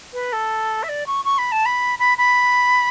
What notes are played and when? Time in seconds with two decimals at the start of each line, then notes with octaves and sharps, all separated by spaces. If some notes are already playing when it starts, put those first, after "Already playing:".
0.13 B4
0.33 A4
0.83 E5
0.89 D5
1.07 C#6
1.25 C#6
1.38 B5
1.52 A5
1.66 B5
1.99 B5
2.18 B5